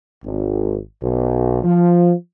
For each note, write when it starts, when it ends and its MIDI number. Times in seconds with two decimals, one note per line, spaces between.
0.24 0.78 32
1.03 1.61 35
1.64 2.13 53